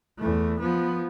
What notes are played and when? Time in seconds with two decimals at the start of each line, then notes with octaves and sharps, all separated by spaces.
0.19 E2 A3
0.60 F3 B3